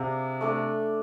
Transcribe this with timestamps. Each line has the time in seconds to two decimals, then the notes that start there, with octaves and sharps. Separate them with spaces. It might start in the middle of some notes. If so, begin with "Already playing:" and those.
Already playing: C3 D4 G#4 F5
0.41 A3 D4 A4 D5